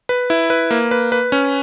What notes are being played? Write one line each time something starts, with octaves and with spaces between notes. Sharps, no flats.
B4
E4
B4
A#3
B4
B4
C#4